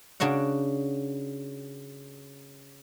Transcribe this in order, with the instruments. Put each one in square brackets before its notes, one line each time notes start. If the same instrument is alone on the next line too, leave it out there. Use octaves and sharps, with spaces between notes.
[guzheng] C#3 D4 F#4 F#5